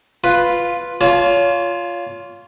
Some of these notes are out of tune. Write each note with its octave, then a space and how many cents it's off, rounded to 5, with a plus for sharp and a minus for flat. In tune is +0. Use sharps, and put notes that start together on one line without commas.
F4 +0 B4 +0
F4 +0 C#5 +30 A5 -35